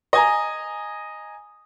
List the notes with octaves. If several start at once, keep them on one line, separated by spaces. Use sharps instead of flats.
D#5 G#5 A#5